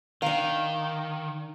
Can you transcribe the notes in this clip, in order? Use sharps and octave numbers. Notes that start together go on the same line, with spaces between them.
D#3 D4 F5